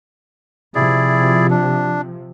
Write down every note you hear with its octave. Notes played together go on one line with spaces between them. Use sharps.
C3 F3 E4 G#4 D5
D4